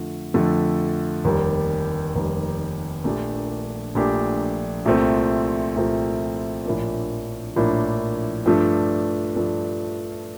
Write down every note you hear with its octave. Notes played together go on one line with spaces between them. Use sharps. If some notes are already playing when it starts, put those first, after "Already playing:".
Already playing: F2 D3 F3 A3
F2 D3 F3 A3
F1 D#2 D#3 G3
F1 D#2 D#3 G3
A#1 A#2 A3 D4 G4
A#1 A#2 A3 D4 G4
C2 A#2 F3 A3 C4
C2 A#2 F3 A3 C4
A#1 A2 F3 A#3 D4
A#1 A2 F3 A#3 D4
G2 F3 A3 D4
G2 F3 A3 D4